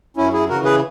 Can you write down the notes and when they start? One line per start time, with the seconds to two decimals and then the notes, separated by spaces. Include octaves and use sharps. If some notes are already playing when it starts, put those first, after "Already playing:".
0.17 F#2 C#4 E4
0.33 E4 G#4
0.49 C#3 E3 F#4 A#4
0.65 G#4 B4